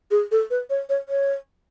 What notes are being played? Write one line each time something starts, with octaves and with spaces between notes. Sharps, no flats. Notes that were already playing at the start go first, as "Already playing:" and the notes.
G#4
A4
B4
C#5
C#5
C#5